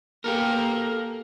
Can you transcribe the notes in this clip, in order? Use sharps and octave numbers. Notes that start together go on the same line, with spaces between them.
A#3 G4 A4 A#4